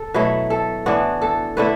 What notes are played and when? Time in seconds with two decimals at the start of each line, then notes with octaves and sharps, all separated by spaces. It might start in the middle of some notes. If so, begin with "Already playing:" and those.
Already playing: A4
0.14 B2 F#3 A3 E4 B4
0.50 A4
0.86 A2 E3 B3 D4 F#4
1.22 A4
1.57 D3 A3 E4 B4